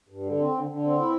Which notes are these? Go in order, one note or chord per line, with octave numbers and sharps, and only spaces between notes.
G2
D3
C4
D3
D3
C4
E4